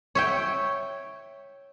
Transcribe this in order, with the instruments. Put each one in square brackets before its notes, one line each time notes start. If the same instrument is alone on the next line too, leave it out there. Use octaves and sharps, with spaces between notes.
[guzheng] C#5 E5 G5